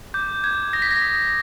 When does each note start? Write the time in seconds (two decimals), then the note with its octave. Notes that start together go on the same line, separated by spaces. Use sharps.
0.14 D6 G6
0.44 F#6 G#6
0.73 D#6 A#6
0.82 B6
0.91 A#6
1.02 D#6